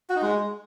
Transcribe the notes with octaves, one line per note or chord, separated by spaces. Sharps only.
F#4
D#4
G#3